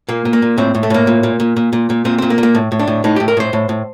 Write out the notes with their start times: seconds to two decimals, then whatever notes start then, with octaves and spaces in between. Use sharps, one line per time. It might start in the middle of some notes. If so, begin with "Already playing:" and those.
0.09 A#2 A#3
0.25 A#2
0.33 A#3
0.42 A#2
0.58 A2 C4
0.75 A2
0.83 A3
0.90 A2 A#3
1.07 A#2
1.23 A#2
1.40 A#2
1.57 A#2
1.73 A#2
1.90 A#2
2.05 A#2 C4
2.18 A#2 C4
2.30 A#3
2.38 A#2
2.43 A#3
2.55 A2
2.72 A2
2.79 D4
2.88 A2
3.04 A2 D#4
3.16 A2 G4
3.28 A#4
3.37 A2 C5
3.53 A2
3.69 A2